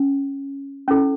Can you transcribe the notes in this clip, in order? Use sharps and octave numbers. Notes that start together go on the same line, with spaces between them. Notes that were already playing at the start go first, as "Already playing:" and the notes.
Already playing: C#4
C#4 E4 A4